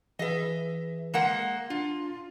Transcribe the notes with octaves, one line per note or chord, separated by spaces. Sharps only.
E3 G#4 B4 D#5 E5
G#3 A#3 F#5
D4 F4